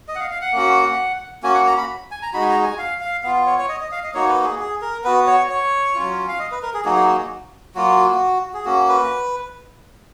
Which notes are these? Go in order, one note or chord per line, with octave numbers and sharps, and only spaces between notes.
D#5
F#5
F5
F5
F#5
A#3 C#4 F#4
A#3 C#4 F#4 G#5
F#5
A#5
B5
G#5
A#5
G#3 D#4 F#4 B5
G#5
A#5
G#5
F5
F5
B3 F4 F5
C#5
C#5
D#5
D#5
F5
D#5
A#3 D#4 F#4 C#5
B4
G#4
G#4
A#4
B3 F#4 B4
C#5
C#5
F#3 C#4 F4
F5
D#5
B4
A#4
G#4
F#3 A#3 D#4 F#4 G#4
G#4
G#4
F#3 A#3 F4 F#4
G#4
A#3 C#4 F#4
B4